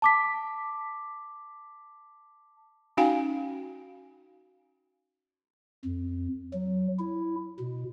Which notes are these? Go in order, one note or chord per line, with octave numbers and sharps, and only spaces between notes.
A5 D6 B6
C#4 D#4 F#4 F5 G5 G#5
F2
F#3
E4
B2